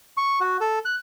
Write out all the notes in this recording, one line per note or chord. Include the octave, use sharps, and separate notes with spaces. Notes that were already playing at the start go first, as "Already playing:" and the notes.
C#6
F#4
A4
F#6